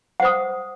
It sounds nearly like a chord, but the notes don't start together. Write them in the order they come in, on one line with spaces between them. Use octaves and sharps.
F#5 C5 D#6